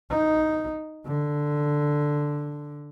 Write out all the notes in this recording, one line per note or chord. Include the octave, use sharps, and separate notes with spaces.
D#4
D3